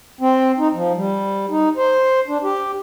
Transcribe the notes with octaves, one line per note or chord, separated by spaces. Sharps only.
C4
D#4
F3
G3
D#4
C5
D4
G4